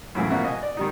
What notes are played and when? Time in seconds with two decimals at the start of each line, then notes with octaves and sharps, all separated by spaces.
0.15 F#2 A2 C#3 E3
0.30 C2 B2 F3 A#3 E5 F#5
0.44 D#5 G#5
0.63 D5
0.77 D#3 G3 D#4